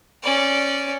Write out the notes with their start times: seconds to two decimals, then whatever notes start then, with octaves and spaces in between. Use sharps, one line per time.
0.23 C#4 D5